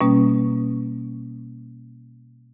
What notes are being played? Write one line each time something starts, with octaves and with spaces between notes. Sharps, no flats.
B2 G3 A#3 C#4